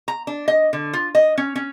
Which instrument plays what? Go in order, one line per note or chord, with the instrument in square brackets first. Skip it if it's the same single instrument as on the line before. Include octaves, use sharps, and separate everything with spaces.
[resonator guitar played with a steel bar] A#5
D4
D#5
D3
F4
D#5
C#4
C#4